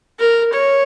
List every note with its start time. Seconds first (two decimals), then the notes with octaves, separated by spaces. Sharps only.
0.19 A#4
0.53 C#5